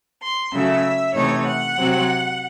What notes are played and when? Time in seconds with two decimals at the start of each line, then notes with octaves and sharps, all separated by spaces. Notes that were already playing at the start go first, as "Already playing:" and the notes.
0.22 C6
0.53 C#3 F#3 A3 E5
1.15 C3 E3 A3 D#4 C#5
1.45 F#5
1.77 C3 F#3 C4